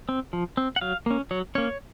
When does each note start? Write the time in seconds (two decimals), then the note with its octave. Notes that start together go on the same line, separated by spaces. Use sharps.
0.09 C4
0.33 F3
0.57 C4
0.76 F#5
0.81 F#3 F5
1.06 A#3 C#4
1.31 F#3 C#5
1.55 A#3 C#4 C#5